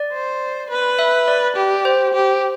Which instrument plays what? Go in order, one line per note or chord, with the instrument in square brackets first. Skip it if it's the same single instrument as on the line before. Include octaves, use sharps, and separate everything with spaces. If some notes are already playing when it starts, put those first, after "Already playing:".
Already playing: [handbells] D5
[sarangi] C5
B4
[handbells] E5
D5
[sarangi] G4
[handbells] C5
[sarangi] G4